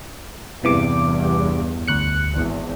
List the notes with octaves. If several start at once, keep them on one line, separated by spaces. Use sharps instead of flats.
E2 G2 C3 E3 D6
D2 F#6 C#7
G#1 E2